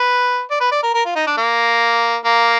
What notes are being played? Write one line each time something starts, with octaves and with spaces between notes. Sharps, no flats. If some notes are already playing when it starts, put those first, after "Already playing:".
Already playing: B4
D5
B4
D5
A#4
A#4
F4
D#4
D4
A#3
A#3